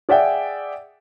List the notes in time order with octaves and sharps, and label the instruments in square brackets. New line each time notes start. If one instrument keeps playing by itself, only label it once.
[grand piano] G#4 D5 E5 F#5 G5